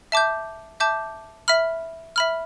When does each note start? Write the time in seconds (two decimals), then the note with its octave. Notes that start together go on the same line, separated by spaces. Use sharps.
0.12 E5 A5 D6 G6
0.80 E5 A5 D6 G6
1.48 E5 B5 F6
2.16 E5 B5 F6